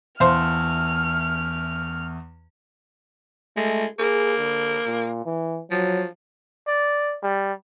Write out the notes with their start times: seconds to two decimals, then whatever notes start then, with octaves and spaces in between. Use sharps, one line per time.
0.20 E2 A3 C5 F5 F6
3.57 G#3 A3
3.99 A#3 G#4
4.38 D3
4.86 A#2
5.25 E3
5.71 F3 F#3
6.67 D5
7.23 G3